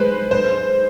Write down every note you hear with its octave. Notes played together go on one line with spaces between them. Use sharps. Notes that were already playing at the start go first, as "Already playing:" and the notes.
Already playing: G#3 B4 C5
C5